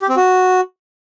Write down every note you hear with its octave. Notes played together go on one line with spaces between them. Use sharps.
G4
C4
F#4